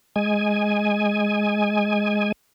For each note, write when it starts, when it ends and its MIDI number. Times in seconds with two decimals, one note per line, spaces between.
0.16 2.32 56
0.16 2.32 80